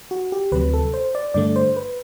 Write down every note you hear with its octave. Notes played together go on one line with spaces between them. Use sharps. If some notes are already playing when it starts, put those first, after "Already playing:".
F#4
G4
D2 C3 F#3 B4
A4
C5
D5
G2 D3 A3 D5
C5
B4